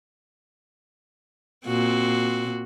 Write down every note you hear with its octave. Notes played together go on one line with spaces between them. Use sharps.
A#2 C4 F#4